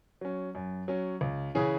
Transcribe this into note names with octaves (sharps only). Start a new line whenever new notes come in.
F#3 C#4
F#2
F#3 C#4
C#2
C#3 E3 C#4 G#4